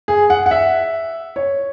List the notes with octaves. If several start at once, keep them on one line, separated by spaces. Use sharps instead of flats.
G#4
F#5
F#5
E5
C#5